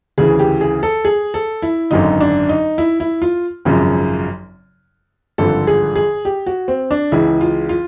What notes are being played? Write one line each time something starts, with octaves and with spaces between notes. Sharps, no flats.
D2 C#3 E3 G#4
G4
G#4
A4
G#4
A4
E4
G#1 F#2 D3 D#4
D4
D#4
E4
E4
F4
G#1 F#2 C#3 F3
G#1 G2 D3 F3 A4
G#4
G#4
G4
F#4
C4
D4
C#2 C#3 E3 E4
F4
F4